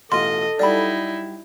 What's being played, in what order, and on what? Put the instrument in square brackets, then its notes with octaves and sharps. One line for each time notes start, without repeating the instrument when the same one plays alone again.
[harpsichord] A1 B2 F4 [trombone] A4 [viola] D#5 [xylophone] C6
[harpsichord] F#3 G3 [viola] D#4 E4 [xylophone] D5 B5